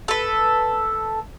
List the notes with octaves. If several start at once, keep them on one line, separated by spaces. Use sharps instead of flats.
A4 B4